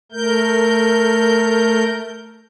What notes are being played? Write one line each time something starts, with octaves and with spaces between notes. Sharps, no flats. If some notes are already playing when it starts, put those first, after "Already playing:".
A3 A#4 G6